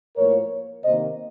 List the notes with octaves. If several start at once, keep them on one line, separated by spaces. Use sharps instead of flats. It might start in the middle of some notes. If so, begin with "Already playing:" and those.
A2 F3 A#3 A#4 C#5
C3 D#3 A#3 C5 D#5